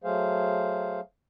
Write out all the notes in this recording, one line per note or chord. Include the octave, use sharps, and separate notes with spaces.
F#3 A3 G#4 C5 F5